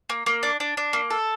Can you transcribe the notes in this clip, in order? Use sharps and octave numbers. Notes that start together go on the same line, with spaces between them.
A#3
A#3
D4
D4
D4
A#3
A4